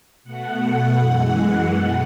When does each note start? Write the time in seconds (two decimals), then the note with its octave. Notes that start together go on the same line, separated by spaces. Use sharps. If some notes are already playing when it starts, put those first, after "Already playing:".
0.24 B2 A3 F#5
0.98 F#2 E3 G#3
1.73 B2 A3